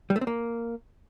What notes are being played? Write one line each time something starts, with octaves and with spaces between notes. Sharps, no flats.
G3
A3
C4
A#3